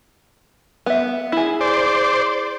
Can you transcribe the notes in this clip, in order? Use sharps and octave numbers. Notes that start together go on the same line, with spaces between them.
B3 E5
E4 G#4
C5 D5